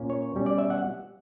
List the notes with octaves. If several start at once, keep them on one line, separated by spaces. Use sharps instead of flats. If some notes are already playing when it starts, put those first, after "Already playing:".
Already playing: A#2 A#3 C#4
C#5
B2 G3 C#4
D5
E5
F#5